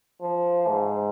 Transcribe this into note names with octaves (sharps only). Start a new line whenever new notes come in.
F3
G#2